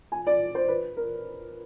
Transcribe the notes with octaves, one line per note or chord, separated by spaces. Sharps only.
G#5
D5
C5
B4
A#4